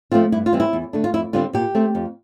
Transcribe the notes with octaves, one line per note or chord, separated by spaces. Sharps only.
F3 A3 C4 F4
G2 E4
F4
E3 G3 C4
E4
E2
D3 A3 D4
F4
F2 E4
D3 G3 C4 F4
A#2 G4
A3 C4
F2